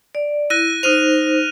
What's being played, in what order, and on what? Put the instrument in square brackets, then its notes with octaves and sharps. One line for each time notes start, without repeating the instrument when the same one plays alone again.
[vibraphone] D5
[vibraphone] E4 [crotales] F#6 A#6 D#7
[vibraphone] D#4 C5 [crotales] F6 D#7 F7